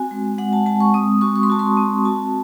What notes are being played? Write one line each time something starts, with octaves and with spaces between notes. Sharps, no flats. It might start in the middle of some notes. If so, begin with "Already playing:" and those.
Already playing: C4 F#4 G#5
G#3
G#3 F#5
A5
G#3 A5
C#6
C4 D#6
F#4 C#6
C#6
C6
F#4 A5
C6
C4
F#4 A5